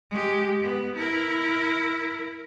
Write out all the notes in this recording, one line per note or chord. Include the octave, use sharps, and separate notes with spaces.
G#3 G4
B3
E4 A#4